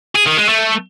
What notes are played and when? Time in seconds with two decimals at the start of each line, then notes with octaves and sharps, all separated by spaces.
0.16 G#4
0.27 D#3
0.38 G#3
0.49 A3